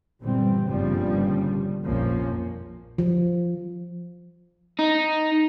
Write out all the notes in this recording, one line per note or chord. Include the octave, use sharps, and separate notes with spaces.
G1 A#2 E3 G3 C4
G1 G2 A#2 C#3 F3 G3
A#1 F2 A#2 F3 A#3 C#4
F3
D#4